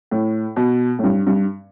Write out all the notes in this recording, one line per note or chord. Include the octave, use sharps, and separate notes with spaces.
A2
B2
A2
G2
G2